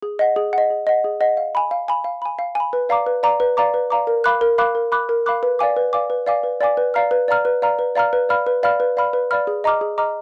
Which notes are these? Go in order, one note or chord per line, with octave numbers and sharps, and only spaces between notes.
G#4
D#5 F#5
G#4
D#5 F#5
G#4
D#5 F#5
G#4
D#5 F#5
F5
G#5 B5
F5
G#5 B5
F5
G#5 B5
F5
G#5 B5
B4
D5 F5 A#5 D6
B4
D5 F5 A#5 D6
B4
D5 F5 A#5 D6
B4
D5 F5 A#5 D6
A#4
F5 B5 D6 F#6
A#4
F5 B5 D6 F#6
A#4
F5 B5 D6 F#6
A#4
F5 B5 D6 F#6
B4
D5 F5 G#5 D6
B4
D5 F5 G#5 D6
B4
D5 F5 G#5 D6
B4
D5 F5 G#5 D6
B4
D5 F5 A#5 F6
B4
D5 F5 A#5 F6
B4
D5 F5 A#5 F6
B4
D5 F5 A#5 F6
B4
D5 F5 B5 F6
B4
D5 F5 B5 F6
B4
D5 F5 B5 F6
B4
D5 F5 B5 F6
G#4
D#5 A#5 D6 F6
G#4
D#5 A#5 D6 F6